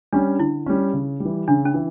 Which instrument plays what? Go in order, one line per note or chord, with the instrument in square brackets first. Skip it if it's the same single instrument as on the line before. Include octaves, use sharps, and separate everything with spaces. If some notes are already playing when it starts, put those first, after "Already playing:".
[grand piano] G3 C#4 [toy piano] D4
[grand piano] D3 [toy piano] E4
[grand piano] G3 C#4
C#3
G3
E3
[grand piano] C#3 [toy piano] D4
[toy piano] C#4
[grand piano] E3